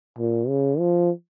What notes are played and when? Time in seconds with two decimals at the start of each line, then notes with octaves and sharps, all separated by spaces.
0.18 A#2
0.48 C#3
0.79 F3